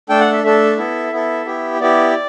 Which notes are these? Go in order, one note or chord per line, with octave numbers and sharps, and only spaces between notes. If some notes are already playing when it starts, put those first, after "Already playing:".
A3 D4 A4 G5
F#5
E5
A3 D4 A4 E5
B3 E4 A4
B3 E4 A4
B3 E4 G4
B3 E4 G4 D5